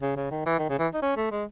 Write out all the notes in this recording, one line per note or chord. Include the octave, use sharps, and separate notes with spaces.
C#3
C#3
D#3
E3
D#3
C#3
E3
D#4
C#4
A3
G#3